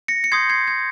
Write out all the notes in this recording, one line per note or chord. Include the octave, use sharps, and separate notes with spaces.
A#6 C#7
C#7
C6 D#6 G6 G#6 C7
G#6 C7
G#6